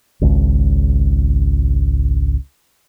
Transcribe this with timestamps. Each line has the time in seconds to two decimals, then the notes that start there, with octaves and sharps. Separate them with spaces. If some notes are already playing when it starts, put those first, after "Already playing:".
0.21 G#1 C#2